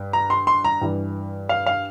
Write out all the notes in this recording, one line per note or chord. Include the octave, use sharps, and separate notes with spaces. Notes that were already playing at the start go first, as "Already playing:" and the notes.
Already playing: G2
A#5
C6
C6
A#5
G2 E3
F5
F5